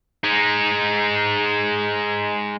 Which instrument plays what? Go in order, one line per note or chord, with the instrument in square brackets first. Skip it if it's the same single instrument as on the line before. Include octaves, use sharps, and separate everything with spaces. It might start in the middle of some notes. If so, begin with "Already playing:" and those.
[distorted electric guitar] G#3 D#4